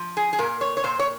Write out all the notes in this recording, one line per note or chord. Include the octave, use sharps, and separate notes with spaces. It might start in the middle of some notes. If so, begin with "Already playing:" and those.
Already playing: F3
G#4
G#4
A#2 A#4
C#5
C#5
A#2 C5
C#5